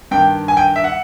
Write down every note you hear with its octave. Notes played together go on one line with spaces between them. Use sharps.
G2 D#3 G5
G#5
G5
E5
F#5